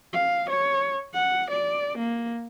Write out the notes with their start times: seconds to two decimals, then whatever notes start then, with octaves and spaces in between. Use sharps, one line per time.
0.13 F5
0.50 C#5
1.14 F#5
1.51 D5
1.98 A#3